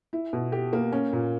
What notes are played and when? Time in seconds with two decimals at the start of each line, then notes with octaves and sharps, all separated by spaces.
0.13 E4
0.33 B2
0.52 G4
0.73 A#3
0.92 C#4
1.13 A#2